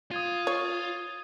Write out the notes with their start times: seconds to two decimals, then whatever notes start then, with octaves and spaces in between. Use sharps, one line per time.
0.11 F4 D#6 G#6 D#7
0.47 C#5